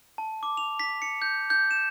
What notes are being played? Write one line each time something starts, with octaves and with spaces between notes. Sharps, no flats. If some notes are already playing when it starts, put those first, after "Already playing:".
A5
D6
F7
B6
C#7
G6
G6
E7